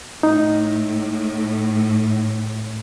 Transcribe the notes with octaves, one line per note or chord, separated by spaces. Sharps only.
A2 D#4